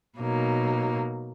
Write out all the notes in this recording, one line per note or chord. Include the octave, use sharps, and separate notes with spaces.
B2 F#3 A#3 D#4